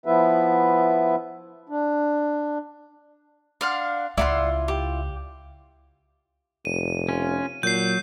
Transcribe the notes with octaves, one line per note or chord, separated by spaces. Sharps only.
F3 B3 E4 B4 E5
D4
D4 F5 F#5 C6
C#2 E4 F4 D5 F#5 C6
G4
F1 D#7
C#4 F4
A#2 F#3 G6 C7